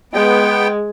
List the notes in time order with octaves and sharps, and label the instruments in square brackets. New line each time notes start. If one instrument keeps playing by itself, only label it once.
[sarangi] G#3 [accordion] B3 G5